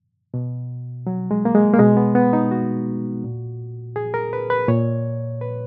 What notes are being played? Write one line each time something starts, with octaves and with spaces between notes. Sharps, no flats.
B2
F#3
G#3
A#3
G#3
A#3
B2 G#3
B3
B3
D#4
F#4
A#2
G#4
A#4
B4
B4
A#2 C#5
B4